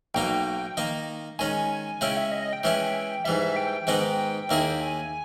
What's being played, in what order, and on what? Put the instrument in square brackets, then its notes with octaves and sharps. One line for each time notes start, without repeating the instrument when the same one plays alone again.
[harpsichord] B1 B2 A#3 D#4 [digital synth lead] G5
[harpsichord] D#3 A#3 D#4
[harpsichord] D#3 G#3 C#4 [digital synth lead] G#5
[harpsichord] C#3 G#3 C#4 E4 [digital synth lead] G5
[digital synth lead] E5
D#5
D#5
G5
[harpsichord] E3 G#3 C#4 E4 [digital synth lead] G5
[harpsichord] G#2 E3 G3 [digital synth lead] E5
[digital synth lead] E5
G5
[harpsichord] G#2 D#3 G#3 B3 D#4
[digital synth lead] G5
[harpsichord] D#2 D#3 A#3 E4 G#4
[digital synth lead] G#5